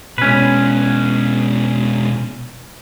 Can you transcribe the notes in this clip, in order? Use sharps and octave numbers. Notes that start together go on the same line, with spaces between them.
B2 G#3 C#4 B4